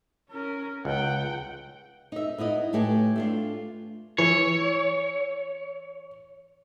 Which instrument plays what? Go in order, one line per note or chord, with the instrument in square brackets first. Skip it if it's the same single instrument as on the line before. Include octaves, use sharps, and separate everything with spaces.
[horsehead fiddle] C#4 A#4
[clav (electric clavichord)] C#2 [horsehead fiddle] F#5 G5
[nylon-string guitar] D#4 E5
B3 D#4 E4 D#5
A2 A3 G4 B4 G#5
A3 D4 F4
[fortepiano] E3 [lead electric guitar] C#5